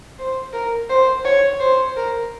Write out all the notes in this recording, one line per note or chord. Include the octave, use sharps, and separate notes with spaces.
C5
A#4
C5
C#5
C5
A#4